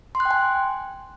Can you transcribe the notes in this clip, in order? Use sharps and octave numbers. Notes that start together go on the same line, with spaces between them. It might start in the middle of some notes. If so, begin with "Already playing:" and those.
C6
F#6
G5
G#5